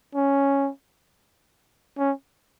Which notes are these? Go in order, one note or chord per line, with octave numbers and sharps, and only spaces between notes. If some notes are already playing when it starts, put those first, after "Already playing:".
C#4
C#4